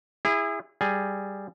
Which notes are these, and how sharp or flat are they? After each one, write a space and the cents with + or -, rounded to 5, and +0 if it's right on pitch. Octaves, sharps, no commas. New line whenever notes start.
E4 +0 G#4 -30
G3 +0 G#4 +0